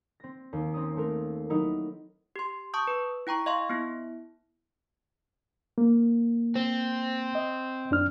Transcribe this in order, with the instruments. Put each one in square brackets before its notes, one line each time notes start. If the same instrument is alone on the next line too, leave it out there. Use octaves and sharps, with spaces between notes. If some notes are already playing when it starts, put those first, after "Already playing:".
[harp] C4 A#6
D#2
C4 C#4 A#5 D#6
A3 C4 A#4
F#3 D#4 E4 A#4
[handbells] G4 C6
A5 C#6 D#6 G6
B4
E4 G5 A#5 C#6
D#5 F5 C6 C#6
B3 E4
[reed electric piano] A#3
[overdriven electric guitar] C4
[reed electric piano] D#5
F#2 D4 F6